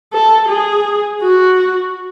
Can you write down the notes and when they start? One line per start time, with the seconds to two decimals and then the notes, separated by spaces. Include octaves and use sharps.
0.13 A4
0.49 G#4
1.21 F#4